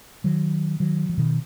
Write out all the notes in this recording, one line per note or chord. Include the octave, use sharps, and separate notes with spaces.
D#3 F#3
D#3 F#3
F3
B2 D#3